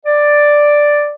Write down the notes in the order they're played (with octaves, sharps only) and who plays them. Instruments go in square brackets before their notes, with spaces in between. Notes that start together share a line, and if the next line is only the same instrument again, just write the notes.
[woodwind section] D5